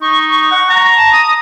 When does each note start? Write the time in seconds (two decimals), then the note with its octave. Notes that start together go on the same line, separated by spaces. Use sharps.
0.01 D#4 C#6
0.29 C#6
0.51 F#5
0.69 A#5
0.96 A5
1.12 D#6